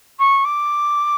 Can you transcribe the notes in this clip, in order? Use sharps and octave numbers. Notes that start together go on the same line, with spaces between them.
C#6
D6